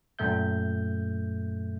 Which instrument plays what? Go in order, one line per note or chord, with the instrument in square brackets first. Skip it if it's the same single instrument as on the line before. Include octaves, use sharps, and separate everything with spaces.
[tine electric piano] F#2 A#2 A3 E5 G6